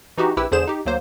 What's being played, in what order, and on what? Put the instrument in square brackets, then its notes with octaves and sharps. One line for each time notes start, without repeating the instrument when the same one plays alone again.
[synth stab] E3 D#4 F#4 G4
A#1 E4 G4 B4 E6
E2 D3 G#4 C5 E7
D#4 G4
D2 F#3 A#3 C5